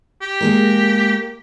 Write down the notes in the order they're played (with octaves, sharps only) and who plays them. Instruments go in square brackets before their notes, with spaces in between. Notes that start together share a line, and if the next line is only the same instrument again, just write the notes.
[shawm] G4
[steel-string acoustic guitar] G#3 A#3 A#4